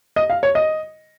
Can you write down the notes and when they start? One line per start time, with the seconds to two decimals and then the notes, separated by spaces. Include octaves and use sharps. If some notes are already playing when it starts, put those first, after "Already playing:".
0.16 D#5
0.30 F5
0.43 C#5
0.55 D#5